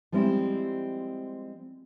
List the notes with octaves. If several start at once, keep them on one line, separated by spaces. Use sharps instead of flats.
F3 G3 G#3 C4 E4